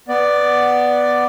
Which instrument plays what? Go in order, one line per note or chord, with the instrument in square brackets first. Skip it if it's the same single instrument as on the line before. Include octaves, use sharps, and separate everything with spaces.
[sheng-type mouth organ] B3 D5